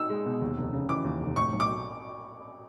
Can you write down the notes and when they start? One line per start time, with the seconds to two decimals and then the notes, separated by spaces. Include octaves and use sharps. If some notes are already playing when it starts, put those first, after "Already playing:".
Already playing: D#4 E6
0.09 G#3
0.26 B2
0.41 D#2
0.57 F1
0.73 C#3
0.89 E3 D6
1.04 D#2
1.20 F1
1.36 A2 C#6
1.53 B1
1.60 D6